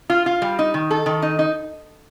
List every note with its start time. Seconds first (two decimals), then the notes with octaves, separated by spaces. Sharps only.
0.10 F4
0.26 F4
0.42 G3
0.59 D#4
0.74 D#3
0.91 A4
1.06 D#3
1.22 D#4
1.39 D#4